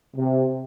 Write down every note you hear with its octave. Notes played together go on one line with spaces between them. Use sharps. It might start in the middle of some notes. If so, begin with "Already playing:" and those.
C3